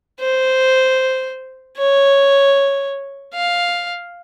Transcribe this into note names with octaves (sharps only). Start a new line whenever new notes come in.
C5
C#5
F5